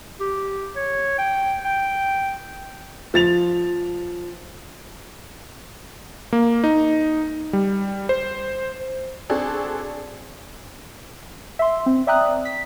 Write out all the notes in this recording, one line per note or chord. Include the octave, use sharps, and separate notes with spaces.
G4
C#5
G5
G5
F3 A6 F7
A#3
D#4
G3
C5
C4 D4 F#4 G#4 A4
E5 C6
C4
D5 E5 G5 A#5 D#6 F#6
B6